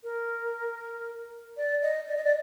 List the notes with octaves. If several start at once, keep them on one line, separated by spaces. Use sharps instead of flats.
A#4
D5
D#5
D5
D#5
D5